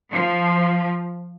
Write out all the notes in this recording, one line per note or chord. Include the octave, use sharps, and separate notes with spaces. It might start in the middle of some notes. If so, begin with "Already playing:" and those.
F3